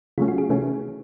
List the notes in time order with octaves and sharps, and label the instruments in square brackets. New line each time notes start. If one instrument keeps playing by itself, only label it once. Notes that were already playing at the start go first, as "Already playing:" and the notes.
[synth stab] C#3 F#3 A3 C#4 [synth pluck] F4
[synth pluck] F#4
G#4
[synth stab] C3 E3 A3 C#4